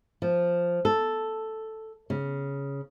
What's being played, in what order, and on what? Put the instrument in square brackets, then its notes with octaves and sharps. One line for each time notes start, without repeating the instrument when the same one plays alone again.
[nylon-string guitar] F3
A4
C#3